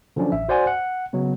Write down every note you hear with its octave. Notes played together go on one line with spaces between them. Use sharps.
D3 F3 F#3 C#4 D4
A1 E5
F#4 C5 D5 F#5 G#5 C6
F#5
C#3 F#3 B3